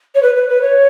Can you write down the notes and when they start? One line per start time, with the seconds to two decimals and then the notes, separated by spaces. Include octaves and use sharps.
0.15 C#5
0.22 B4
0.35 B4
0.49 B4
0.61 C#5